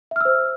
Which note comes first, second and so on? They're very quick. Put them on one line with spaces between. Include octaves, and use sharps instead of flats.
E5 F6 E6 C5